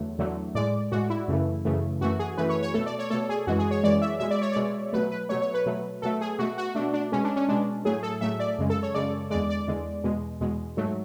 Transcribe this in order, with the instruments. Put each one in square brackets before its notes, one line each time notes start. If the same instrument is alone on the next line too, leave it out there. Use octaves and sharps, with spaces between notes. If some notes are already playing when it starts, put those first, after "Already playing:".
Already playing: [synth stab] E2 D3 F#3 A3
E2 D3 F#3 A3
A2 G#3 D5
A2 G#3 F#4
E4
F#2 C#3 E3 A3
F#2 C#3 E3 A3
F#2 E3 A3 F#4
G#4
F#2 E3 A3 B4
C#5
C#5
B2 A3 A4
D5
C#5
B2 A3 A4
G#4
F#2 E3 G#3 F#4
G#4
C#5
F#2 E3 G#3 D5
E5
B2 G#3 E5
D5
C#5
B2 G#3 D5
B2 F#3 A3 B4
B4
B2 F#3 A3 C#5
C#5
B4
B2 F#3 A3
B2 F#3 A3 A4
G#4
B2 A3 F#4
F#4
B2 A3 D4
D4
B2 G#3 C#4
D4
C#4
B2 G#3 D4
A2 F#3 A3 G#4
A4
A2 F#3 A3 E5
D5
F#2 C#3 G#3
A4
C#5
F#2 C#3 G#3 D5
E2 D3 G#3 D5
D5
E2 D3 G#3
E2 B2 G#3
E2 B2 G#3
G#2 F#3 A3